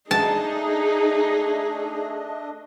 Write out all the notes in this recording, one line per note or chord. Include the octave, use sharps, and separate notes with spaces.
A3 D4 D#4 G#4 D#5 A5